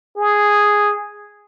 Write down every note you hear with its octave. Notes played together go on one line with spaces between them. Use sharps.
G#4